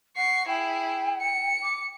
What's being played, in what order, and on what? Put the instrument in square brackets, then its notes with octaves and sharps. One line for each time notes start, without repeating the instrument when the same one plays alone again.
[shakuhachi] F#5 [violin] C#6 C7
[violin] E4 G#4 [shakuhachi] G5
[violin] C#7
[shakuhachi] D6